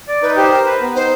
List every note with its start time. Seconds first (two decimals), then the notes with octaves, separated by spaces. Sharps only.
0.08 D5
0.22 D#4 B4
0.36 G4 C5
0.51 A#4
0.66 B4
0.81 B3
0.95 D#4 C5